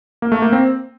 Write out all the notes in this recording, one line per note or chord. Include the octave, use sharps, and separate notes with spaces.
A#3
A3
A#3
C4